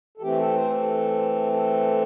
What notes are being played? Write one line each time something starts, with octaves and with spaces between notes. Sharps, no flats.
A4
E3 A3 C4 G4
A4
C5
A4
A4